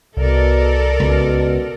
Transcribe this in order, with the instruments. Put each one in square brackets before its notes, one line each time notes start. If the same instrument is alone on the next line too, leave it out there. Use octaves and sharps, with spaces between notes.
[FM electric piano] C2 [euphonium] B2 [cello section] A4 A#4 D5
[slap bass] C#2 [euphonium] B2